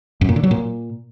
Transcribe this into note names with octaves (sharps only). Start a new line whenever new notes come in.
F#2
A#2
D3
F#3
A#2